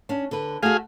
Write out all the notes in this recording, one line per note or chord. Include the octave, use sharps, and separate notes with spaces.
C#4 D4
D3 B4
A3 F#4 G#4 F5